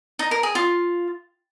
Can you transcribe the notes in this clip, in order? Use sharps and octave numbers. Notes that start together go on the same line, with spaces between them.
D#4
A#4
G#4
F4